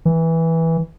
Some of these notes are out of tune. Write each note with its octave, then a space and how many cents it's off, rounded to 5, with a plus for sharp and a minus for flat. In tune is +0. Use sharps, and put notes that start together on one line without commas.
E3 -10